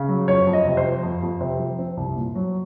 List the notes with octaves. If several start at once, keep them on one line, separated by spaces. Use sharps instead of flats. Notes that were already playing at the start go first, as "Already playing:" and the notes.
Already playing: C#3
F#3
F2 C#5
F2
D#5
C3
C5
F3
F2
F2
C3 C5
F3
C4
C2
A#2
F#3